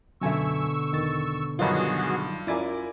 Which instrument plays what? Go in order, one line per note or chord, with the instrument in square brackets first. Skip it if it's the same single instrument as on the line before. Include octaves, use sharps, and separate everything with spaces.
[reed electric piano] F#2 G#5 [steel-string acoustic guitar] B2 D3 E5 [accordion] C#6 E6
[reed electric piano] E2 D#3 A6
[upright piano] G2 F4 [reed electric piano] D#3 F#3 D#4 [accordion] B3 F#4 G#4
[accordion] F#2 [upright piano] E4 D5 G#5 [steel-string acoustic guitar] F4 A#4